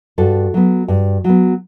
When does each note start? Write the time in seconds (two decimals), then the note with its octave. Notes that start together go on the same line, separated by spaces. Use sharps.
0.18 G2 F#4 A4
0.54 F#3 B3
0.88 G2
1.24 F#3 B3